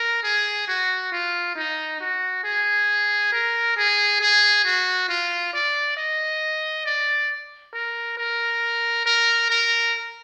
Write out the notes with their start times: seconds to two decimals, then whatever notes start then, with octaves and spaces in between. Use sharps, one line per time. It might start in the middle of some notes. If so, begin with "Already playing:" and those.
Already playing: A#4
0.23 G#4
0.68 F#4
1.12 F4
1.56 D#4
2.00 F#4
2.44 G#4
3.32 A#4
3.77 G#4
4.20 G#4
4.65 F#4
5.09 F4
5.53 D5
5.97 D#5
6.85 D5
7.73 A#4
8.17 A#4
9.06 A#4
9.50 A#4